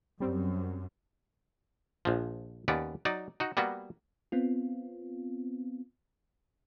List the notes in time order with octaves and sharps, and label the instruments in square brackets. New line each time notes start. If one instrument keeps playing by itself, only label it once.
[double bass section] F#2 [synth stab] G3 C4
[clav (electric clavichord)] A#1 F3
D#2 B3 C#4 D5
F#3 D#4 D5
D#4 F#4
G3 A#3 B3 F#4
[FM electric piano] B3 C4 F4